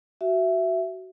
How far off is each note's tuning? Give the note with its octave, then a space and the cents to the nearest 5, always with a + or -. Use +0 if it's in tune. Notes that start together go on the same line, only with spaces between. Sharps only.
F#4 +15 E5 +10